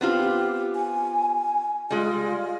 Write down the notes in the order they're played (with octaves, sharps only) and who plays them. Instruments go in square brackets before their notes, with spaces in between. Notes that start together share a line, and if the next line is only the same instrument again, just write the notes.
[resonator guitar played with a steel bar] B3 C4 F4 [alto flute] G4
[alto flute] G#5
[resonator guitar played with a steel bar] G3 G#3 [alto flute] F4